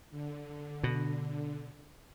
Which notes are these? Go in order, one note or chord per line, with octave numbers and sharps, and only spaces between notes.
D3
B2